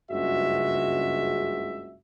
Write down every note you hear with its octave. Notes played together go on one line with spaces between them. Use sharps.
F#1 C#2 G2 G#3 F#4 E5